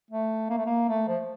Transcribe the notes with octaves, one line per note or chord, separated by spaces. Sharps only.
A3
A#3
A3
A#3
A3
F3